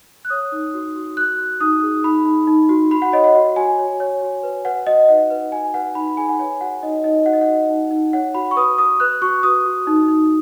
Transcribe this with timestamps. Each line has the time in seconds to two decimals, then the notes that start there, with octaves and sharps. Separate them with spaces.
0.25 F#6
0.30 C#5 D#6
0.52 D#4
0.74 F#4
0.96 F#4
1.17 F#4 F#6
1.39 F#4
1.60 D#4 D#6
1.83 G#4
2.04 D#4 B5
2.25 D#4
2.47 D#4
2.69 F#4
2.91 F#4 B5
3.02 F#5
3.13 C#5 D#5
3.24 F#5
3.35 F#4
3.56 F#4 G#5
3.78 C#5
4.00 C#5
4.22 F#4
4.43 B4
4.65 B4 F#5
4.87 F#4 D#5
5.09 D#4 F#5
5.30 B4
5.52 F#4 G#5
5.74 B4 F#5
5.95 D#4 B5
6.17 G#4 G#5
6.29 F#5
6.39 C#5 G#5
6.61 F#4 F#5
6.83 D#4 D#5
7.04 D#4 D#5
7.26 F#4 F#5
7.33 D#5
7.41 F#5
7.48 F#4
7.70 D#4
7.91 D#4
8.13 C#5 F#5
8.35 F#4 B5
8.51 C#6
8.56 B4 D#6
8.78 B4 D#6
9.00 B4 F#6
9.22 F#4 C#6
9.43 F#4 D#6
9.65 F#4
9.87 D#4
10.08 D#4